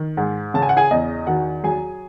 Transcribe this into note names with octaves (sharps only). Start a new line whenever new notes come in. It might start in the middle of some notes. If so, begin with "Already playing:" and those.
Already playing: D#3
G#2
C#3 A5
G#5
F#5
G#4 G#5
E2 D#5
D#3 F#4 F#5
F#3 G#4 G#5